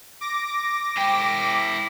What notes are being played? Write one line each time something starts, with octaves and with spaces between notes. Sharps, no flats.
D6 A#6
E4 G5